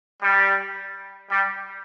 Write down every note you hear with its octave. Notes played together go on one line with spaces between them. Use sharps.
G3
G3